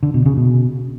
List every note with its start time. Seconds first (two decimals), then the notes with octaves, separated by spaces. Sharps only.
0.03 D3
0.14 B2
0.26 C#3
0.37 B2